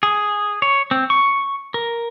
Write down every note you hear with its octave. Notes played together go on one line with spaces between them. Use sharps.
G#4
C#5
C4
C#6
A#4